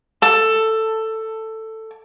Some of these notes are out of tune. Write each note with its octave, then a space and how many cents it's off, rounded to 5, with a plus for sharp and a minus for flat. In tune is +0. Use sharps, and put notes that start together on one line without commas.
A4 +10